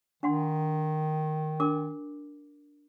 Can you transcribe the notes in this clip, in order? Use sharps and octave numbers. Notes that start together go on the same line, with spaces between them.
D#3 D4 F#5 C6
D4 A#4 D6